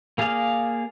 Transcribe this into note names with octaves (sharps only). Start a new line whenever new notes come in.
A#3 G#4 D5 F5